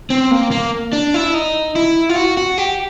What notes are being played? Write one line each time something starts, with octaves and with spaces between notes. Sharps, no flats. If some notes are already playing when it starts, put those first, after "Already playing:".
C4
A#3
A#3
D4
E4
D#4
E4
F4
F#4
F#4
G4